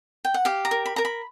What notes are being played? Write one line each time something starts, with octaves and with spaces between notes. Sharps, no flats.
G5
F#5
G4 F5
A#5
A#4
B5
A#4 A#5
B5